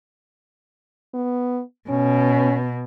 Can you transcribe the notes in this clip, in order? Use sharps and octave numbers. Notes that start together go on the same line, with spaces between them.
B3
B2 C#4